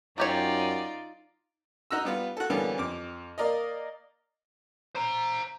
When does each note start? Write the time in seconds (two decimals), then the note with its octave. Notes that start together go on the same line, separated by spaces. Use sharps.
0.18 F#2 F#3 D#4 F4 G4 C#5 D5
1.91 D#4 F#4 A#5 E6
2.05 G3 B3 F4
2.37 F#4 A4
2.50 D3 E3 G3 A#3 B3 C#4
2.78 F2 D6
3.38 A#3 A#4 D5 D#5
4.95 C5 A#5